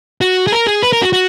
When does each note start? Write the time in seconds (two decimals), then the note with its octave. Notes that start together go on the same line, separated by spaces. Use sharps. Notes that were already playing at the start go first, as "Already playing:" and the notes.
0.21 F#4
0.47 G#4
0.52 A#4
0.67 G#4
0.82 B4
0.93 A#4
1.02 F#4
1.13 F#4